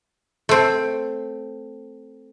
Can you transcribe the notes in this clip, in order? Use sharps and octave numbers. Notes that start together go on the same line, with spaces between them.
A3 C4